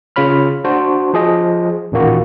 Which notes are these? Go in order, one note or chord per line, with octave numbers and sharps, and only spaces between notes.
C#3 F4 C#5 B5 F6
D4 F#4 C5
F3 G#4 D#5
A1 D#2 A#2 D#3 A#3 F#4